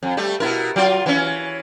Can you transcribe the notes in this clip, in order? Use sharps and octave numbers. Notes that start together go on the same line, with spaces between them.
F2
G3 A3
B2 E4 A#4
F#3 F4
E3 C#4